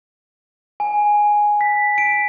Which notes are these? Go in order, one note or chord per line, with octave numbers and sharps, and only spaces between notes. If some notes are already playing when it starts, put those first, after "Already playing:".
G#5
B6
D7